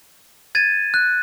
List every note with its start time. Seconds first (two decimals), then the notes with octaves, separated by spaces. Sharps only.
0.55 G#6 A6 D#7
0.94 F#6